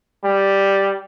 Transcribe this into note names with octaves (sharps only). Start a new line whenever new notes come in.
G3